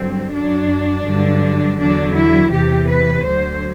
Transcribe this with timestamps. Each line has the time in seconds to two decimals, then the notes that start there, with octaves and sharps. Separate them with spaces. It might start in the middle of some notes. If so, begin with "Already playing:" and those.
Already playing: G2 D3 F#3 C4
0.32 F#2 F#3 D4
1.05 G2 D3 F#3
1.79 E2 D3 F#3 D4
2.15 E4
2.51 E2 C3 E3 G4
2.88 B4
3.25 D2 D3 F#3 C5